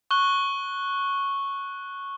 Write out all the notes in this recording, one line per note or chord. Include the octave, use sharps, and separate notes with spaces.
C#6 F#6 G7